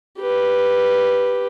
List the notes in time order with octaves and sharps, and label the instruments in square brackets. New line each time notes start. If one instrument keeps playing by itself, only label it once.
[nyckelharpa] G4 B4